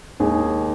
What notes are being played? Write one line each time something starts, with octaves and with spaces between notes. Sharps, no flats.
D#2 D#3 G#3 G#4